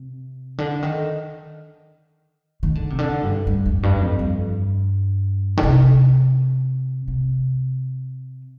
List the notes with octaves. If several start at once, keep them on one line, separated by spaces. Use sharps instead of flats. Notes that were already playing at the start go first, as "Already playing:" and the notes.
Already playing: C3
D3
D#3
D#3
D3
C3
D3
G2
G2
F2
G2
F2
G2
D3
C3
C3